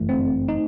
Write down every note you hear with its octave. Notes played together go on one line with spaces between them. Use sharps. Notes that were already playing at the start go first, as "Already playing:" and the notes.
Already playing: G1 F#2 E3 A3
C4
D#4